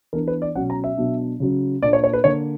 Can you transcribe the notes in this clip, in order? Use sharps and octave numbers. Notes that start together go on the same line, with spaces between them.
E3 B3 D4 A#4
B4
D5
B2 F#3 C#4 F#5
A#5
E5
B2 F#3 B3 D4
C#3 F#3 C#4
A#2 A#3 D4 D5
C#5
C#5
B4
D3 A#3 D4 C#5